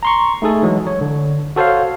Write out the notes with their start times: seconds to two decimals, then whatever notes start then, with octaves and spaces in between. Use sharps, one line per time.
0.03 A#5 C6 C#6
0.42 A3 D#4 G#4 A4
0.63 E3 F#3 G#3
0.87 C#5
1.01 D3
1.56 F#4 A4 C5 C#5 F5